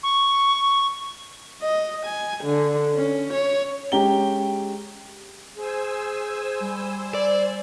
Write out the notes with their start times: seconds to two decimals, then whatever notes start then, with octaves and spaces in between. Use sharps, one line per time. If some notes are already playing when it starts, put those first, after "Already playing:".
0.03 C#6
1.62 D#5
2.06 G#5
2.44 D3
2.95 C#4
3.33 C#5
3.92 G#3 C#4 G4 G5 A#5 G7
5.57 G#4 C5 G#5 E6
6.61 G3
7.14 D5